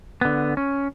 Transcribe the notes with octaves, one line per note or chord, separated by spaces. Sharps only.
D3 B3
C#4